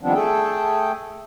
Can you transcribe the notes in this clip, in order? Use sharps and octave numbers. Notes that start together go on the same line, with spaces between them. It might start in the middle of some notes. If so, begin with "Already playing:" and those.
D#3 F3 G3 B3 C4 D4
A3 G#4 A4 G5